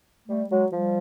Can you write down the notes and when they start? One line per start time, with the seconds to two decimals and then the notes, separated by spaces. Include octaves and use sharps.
0.28 G3 A3
0.50 F#3 G#3
0.72 F3 G3